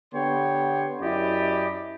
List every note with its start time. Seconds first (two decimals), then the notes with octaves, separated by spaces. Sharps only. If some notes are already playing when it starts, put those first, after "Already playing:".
0.14 D3 B3 G4 C#5 G5 C6
1.01 F#2 C#4 E4 G4 D5 D#5